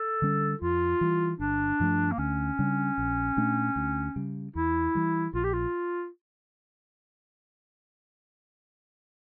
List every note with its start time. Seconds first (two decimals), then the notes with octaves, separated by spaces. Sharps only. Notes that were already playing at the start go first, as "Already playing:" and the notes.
Already playing: A4
0.22 D3 G3 C#4
0.61 F2 F4
1.01 E3 G3
1.39 G1 D4
1.80 G2 F3 A3
2.12 A#3
2.18 D2 C#4
2.59 C#3 G3 D4
2.98 A#1
3.37 A#2 A3 D4
3.76 D2
4.16 C#3 G3
4.55 E2 E4
4.95 E3 G3
5.34 A#1 F4
5.44 G4
5.53 F4